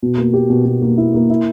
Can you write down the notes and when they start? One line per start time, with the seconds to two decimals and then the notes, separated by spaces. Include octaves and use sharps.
0.02 B2
0.18 A#3
0.33 G4
0.50 B2
0.65 B2
0.82 A#3
0.98 E4
1.14 A#3
1.30 E4